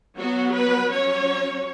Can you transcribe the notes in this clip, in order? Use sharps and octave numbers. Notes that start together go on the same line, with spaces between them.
F#3 B3 F#4
B4
F#3 C#4 C#5